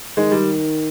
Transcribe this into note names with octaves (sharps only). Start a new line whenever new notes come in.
D#3 G#3
G3